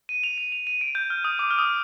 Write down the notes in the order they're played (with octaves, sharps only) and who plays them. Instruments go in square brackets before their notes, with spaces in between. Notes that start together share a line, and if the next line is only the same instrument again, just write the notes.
[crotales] D#7
F7
D#7
F7
D#7
D7
G6
F6
D#6
D6
F6
D#6